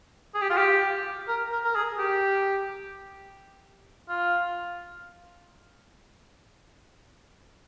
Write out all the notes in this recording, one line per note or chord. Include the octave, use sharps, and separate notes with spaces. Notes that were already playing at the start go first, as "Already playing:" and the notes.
G#4
G4
F4
G4
A#4
A#4
A#4
G#4
G4
F4